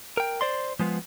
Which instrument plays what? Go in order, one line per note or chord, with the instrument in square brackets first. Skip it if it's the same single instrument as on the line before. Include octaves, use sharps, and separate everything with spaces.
[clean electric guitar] A#4 G5
C5 D5 C6
F3 G#3 B3 F4